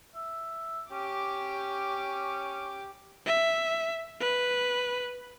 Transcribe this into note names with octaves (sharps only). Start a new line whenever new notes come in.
E5
C#4 G4 D6
E5
B4